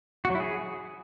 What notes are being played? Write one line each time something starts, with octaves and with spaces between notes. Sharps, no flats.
F#4
F#3
E4
G#4